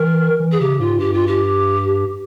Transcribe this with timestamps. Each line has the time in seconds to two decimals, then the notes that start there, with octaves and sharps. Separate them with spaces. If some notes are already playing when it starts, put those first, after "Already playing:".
Already playing: E3 A#4
0.40 E3
0.52 G#4
0.60 C#3 G4
0.80 G#2 F4
0.98 G2 G4
1.13 F4
1.27 G4